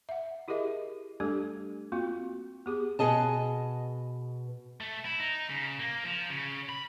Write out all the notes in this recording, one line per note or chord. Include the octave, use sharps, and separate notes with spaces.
E5 F#5
E4 G4 G#4 A#4 D#5 E5
G3 A3 D4 G4 A4
A#3 C4 F4 F#4
B3 G4 G#4
B2 B3 G#4 D#5 A5
A3
E4
D#4
C#3
A#3
F3
C#3
B5